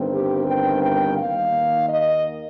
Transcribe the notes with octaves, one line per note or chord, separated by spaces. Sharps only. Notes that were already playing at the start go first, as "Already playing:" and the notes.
Already playing: G1 G2 D#3 C4
G4
G5
G5
D#2 D#3 A#3 F5
D#5